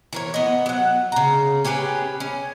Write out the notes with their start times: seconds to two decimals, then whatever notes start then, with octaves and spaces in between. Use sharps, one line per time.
0.13 E3 A#4 C#5
0.34 B3 D#5
0.66 F#3 F#5
1.12 C#3 A#5
1.65 C#4 G4 G#4 B4
2.20 C#4